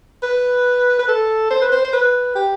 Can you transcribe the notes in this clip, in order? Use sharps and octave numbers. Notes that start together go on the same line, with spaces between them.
B4
B4
A4
C5
B4
C5
C5
B4
G4